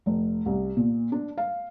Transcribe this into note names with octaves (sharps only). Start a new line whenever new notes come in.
F1
C2
A#2
D4
F5